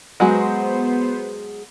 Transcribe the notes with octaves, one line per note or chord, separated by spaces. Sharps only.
F#3 G#3 B3 F#4 C5